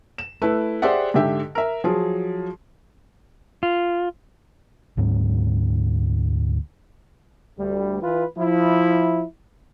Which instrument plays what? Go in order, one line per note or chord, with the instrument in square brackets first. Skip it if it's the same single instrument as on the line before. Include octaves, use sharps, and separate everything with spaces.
[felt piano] E7
A3 E4 B4
G4 G#4 C5 D5 E5 F#5
G#2 D3 G4 E5 G5
A#4 E5
F3 F#3 G#4
[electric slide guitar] F4
[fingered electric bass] D2 G#2 F#3 C4
[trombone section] D2 G3
E3 F4 B4
F3 E4